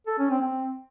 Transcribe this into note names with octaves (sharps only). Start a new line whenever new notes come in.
A4
C#4
C4
C4